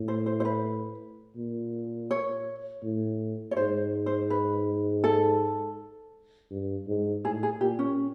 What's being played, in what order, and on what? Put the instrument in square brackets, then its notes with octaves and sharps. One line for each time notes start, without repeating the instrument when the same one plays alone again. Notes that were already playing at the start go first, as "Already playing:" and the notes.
Already playing: [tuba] A2
[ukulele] C5
C5
C5
B4
[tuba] A#2
[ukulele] C#5
[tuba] A2
[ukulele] C#5
[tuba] G#2 [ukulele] C5
[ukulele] C5
B4
A4
[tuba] G2
G#2
[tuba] A2 [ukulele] G#4
[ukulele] G#4
[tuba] A#2 [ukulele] G4
[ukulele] C#4